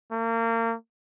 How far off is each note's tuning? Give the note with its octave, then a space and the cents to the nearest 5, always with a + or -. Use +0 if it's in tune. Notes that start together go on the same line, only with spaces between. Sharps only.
A#3 -30